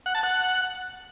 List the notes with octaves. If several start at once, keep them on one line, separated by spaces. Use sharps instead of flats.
F#5
A5
F#5